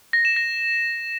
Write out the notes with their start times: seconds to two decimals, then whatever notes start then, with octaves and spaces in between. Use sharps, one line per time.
0.13 A#6
0.25 E7
0.36 A#6